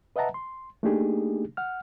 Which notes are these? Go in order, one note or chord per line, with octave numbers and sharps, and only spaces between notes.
B4 D#5 E5 F#5 A5 A#5
C6
A3 A#3 D4 D#4 G4 G#4
F#5 F6